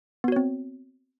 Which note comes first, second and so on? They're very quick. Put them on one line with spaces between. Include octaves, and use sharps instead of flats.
B3 F#4 C#5 C4